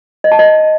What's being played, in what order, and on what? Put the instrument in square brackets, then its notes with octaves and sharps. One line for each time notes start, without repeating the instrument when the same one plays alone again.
[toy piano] D#5
A5
D#5